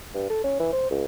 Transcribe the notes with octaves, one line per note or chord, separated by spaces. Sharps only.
G2
A4
C#4
E3
C5
C#2